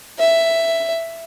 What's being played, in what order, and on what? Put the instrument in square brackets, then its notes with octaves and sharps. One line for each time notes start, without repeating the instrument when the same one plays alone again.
[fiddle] E5